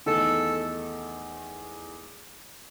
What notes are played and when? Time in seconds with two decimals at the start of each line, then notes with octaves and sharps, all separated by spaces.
0.06 E2 D#3 A3 D#4 A4